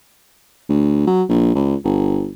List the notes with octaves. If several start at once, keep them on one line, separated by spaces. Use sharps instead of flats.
D2
F#3
A#1
C#2
G1